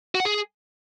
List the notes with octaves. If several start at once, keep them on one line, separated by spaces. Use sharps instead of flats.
F#4
F#5
G#4